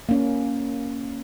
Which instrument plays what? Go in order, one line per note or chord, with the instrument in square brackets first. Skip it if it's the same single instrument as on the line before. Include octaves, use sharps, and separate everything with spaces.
[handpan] A#3 C#4